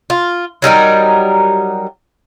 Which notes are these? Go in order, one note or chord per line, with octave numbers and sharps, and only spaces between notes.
F4
F#3 G3 D#4 A#4